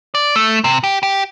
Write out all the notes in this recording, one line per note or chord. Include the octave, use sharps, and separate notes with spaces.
D5
A3
C3
G4
G4